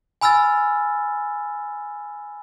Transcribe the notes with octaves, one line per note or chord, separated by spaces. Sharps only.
G#5 B5 E6 F6 A6